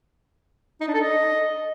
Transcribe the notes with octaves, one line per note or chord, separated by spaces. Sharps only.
D#4
D4
A4
D#5